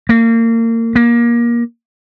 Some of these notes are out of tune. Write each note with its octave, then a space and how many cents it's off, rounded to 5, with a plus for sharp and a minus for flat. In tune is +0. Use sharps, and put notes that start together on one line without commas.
A#3 -30
A#3 +20